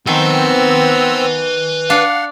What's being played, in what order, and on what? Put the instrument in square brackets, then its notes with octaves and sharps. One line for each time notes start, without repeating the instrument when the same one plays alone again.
[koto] D#3 [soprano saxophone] B3 [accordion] C4 E6 [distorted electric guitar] B4 G#5
[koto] D4 [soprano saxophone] F5 [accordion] F#5